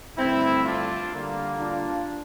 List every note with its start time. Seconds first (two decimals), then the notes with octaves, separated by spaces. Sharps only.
0.17 G2 D3 A3 C4 E4
0.64 D4 F4
1.13 D3 G3 A#3
1.59 D4 F4